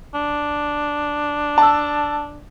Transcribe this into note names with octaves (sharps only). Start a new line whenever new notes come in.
D4
A5 E6